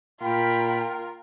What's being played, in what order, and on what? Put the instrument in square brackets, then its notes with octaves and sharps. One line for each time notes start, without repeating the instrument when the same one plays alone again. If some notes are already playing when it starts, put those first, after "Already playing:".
[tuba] A#2 [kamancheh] F4 A#4 [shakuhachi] G5 [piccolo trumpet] B5